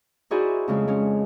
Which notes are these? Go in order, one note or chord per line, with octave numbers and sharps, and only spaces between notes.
D#4 E4 F#4 G#4 C5 D5
F2 C#3 G#3
G#3 C#4